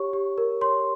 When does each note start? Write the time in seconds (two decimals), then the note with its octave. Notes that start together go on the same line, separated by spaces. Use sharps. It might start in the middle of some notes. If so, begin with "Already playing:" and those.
Already playing: G4 C#5 C#6
0.13 G4
0.38 A#4
0.61 C#5 C6